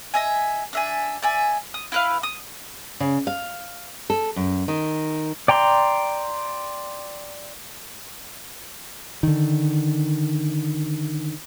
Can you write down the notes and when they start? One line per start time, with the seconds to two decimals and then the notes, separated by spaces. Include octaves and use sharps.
0.14 D#5 E5 G#5
0.73 D4 E5 G#5
1.22 D5 E5 G#5
1.74 D#6
1.92 E4 B4 F5
2.23 D#6
3.00 C#3
3.27 F5
4.10 A4
4.36 F#2
4.68 D#3
5.48 D5 G5 A#5 C6
9.23 D3 D#3